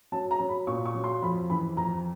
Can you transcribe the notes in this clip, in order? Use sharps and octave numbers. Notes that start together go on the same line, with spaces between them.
F#3 A5
A#5
F#3
B5
A#2 C#6
C#6
F#3
C6
F2 B5
E3 B5
F2 A#5